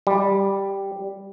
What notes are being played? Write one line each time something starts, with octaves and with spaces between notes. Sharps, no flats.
G3